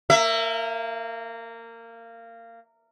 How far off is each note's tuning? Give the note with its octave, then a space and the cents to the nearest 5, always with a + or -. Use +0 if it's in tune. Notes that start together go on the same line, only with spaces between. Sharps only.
A#3 -20 E5 +20